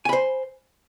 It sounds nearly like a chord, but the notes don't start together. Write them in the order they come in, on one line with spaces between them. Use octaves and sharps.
G#5 B5 C5